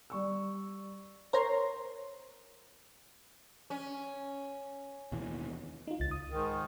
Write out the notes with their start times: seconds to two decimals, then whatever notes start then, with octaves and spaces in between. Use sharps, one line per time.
0.10 G3 C#6 E6
1.33 A#4 C5 C#5 A#5 C6
3.70 C#4
5.12 D#2 B2 E3
5.87 D#4 F4
6.00 C#2 A6
6.11 D#6
6.30 G#2 D#3